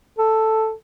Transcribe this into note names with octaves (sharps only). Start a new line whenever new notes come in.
A4